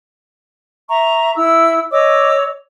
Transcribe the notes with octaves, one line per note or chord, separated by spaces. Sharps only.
E5 A#5 C#6
E4 E6
C#5 D#5 D6 E6